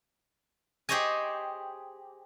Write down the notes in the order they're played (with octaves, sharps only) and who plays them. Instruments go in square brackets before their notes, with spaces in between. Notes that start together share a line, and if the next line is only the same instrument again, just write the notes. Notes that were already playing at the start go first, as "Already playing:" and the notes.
[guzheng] G4 G#4 C5 C#5 D#5 G#5